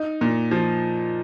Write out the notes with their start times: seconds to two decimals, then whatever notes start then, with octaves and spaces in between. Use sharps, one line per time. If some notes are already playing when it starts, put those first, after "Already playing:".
Already playing: D#4
0.21 A#2
0.51 F3